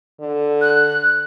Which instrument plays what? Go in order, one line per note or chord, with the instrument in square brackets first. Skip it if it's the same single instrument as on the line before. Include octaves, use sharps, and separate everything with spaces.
[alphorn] D3
[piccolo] F#6